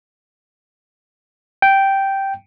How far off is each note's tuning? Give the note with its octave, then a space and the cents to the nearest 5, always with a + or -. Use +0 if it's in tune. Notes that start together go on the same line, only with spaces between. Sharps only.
G5 -5